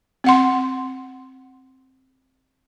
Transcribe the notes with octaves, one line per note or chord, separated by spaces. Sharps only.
C4 F#5 C6